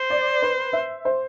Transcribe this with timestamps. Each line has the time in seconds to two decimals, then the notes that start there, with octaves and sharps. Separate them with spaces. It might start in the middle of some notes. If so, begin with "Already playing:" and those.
Already playing: C5
0.10 D5
0.42 B4
0.73 E5
1.05 C5